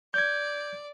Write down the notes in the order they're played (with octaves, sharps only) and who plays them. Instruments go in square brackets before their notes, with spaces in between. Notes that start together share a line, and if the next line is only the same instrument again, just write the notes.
[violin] D5 [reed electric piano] G6 G#6